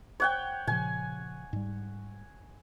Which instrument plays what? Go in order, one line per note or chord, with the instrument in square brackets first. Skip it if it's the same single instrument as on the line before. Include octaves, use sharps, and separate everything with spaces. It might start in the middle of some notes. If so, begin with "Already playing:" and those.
[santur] C#5 F#5 G5
[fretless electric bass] A#2 C#3 F3 [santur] G#5
[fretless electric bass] G#2 G3